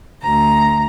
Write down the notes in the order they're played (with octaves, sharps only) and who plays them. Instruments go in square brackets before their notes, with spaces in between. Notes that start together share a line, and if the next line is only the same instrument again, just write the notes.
[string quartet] D2 A#5